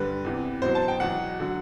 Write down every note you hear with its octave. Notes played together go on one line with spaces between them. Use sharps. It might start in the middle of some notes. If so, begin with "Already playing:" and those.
Already playing: G2 D3 G3 B4
E2 C3 E3
B2 F#3 C5
A5
G5
E2 B2 F#3 F#5
D3 F#3